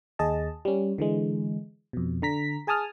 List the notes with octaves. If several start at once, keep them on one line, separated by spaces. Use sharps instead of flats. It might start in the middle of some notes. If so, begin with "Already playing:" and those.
D#2 G#4 D#5 A5
G3 C#4
D3 E3 G#3
F2 B2
D3 A#5 B6
G#4 G#5 A5 D#6 F6